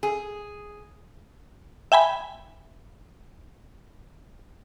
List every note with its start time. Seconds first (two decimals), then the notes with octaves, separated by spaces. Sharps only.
0.03 G#4
1.92 E5 G5 G#5 B5